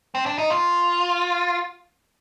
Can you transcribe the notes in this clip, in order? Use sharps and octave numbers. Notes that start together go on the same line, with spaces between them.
C4
D4
D#4
F4